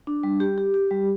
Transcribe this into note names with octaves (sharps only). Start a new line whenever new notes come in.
D4
G3
G4
G4
G4
G3